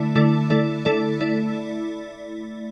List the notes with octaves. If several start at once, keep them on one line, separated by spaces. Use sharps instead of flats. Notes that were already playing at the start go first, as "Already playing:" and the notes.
Already playing: D3 A3 E4 D5
D3 A3 E4 A4 D5
D3 A3 E4 A4 D5
D3 A3 E4 A4 D5
A3 E4 D5